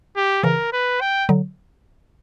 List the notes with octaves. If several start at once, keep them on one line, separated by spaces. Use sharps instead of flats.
G4
C#3 E3 A#4
B4
G5
D3 F#3